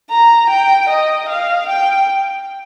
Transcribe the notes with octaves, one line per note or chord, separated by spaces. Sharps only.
A#5
G5
D#5
F5
G5